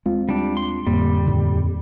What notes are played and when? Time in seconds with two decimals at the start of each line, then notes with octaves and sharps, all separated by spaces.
0.06 D#2 G#3 C4 F4
0.29 G3 D4
0.57 C6
0.87 F2 A2 D3 G3 A#3
1.25 D#2 A2 D3 D#3